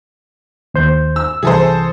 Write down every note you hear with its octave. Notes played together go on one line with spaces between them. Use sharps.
D#2 C5 G6
E6
C2 E3 G#4 A4 C5